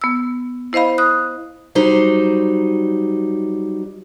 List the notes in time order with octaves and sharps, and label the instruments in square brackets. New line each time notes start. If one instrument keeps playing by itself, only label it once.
[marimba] B3 E6
E4 C5 D#5 F5 B5
D#6 F#6
[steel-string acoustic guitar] F#3 G3 D#4 C5